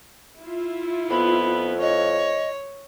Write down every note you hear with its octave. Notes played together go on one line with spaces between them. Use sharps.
E4 F4
F2 B3 B5
C#5 D#5